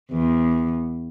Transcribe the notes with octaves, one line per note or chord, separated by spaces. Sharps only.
E2